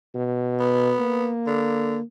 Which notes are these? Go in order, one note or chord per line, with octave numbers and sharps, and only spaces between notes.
B2
B3
A#3
D3